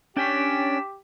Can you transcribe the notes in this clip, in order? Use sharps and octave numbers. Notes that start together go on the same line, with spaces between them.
C#4 D4 G4 D5 G5 B6 E7